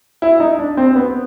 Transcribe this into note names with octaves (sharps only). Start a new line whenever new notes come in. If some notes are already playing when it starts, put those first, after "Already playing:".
E4
D#4
D4
C4
B3